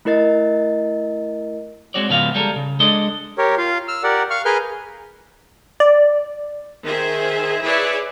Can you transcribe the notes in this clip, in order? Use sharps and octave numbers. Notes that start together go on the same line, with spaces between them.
A3 E4 A#4 D#5 A6
G#3 C4 F#4 C#5 D5
G#2 C#3 F3 B3 F#4 F5
D2 G3 G#3 A4 A#4
C#3
G#3 D4 A4 D5 D#5
G4 A#4 C#5
F4 F5
E6 F6
G4 A#4 D5 F#5
F5 C#6 F6
G#4 A#4 B4 G#5 F6 G6
D5
D#3 G#4 C5 E5
E4 G#4 B4 C#5 D5 E5